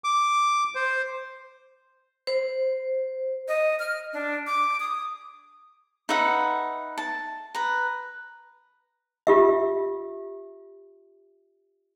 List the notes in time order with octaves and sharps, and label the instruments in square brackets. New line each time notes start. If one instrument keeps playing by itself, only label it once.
[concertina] D6
C5
[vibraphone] C5
[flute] D#5
F6
D4
D6
D#6
[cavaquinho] D#4 B4 E5 F#5
A5
B4 A#5
[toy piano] F4 G4 E5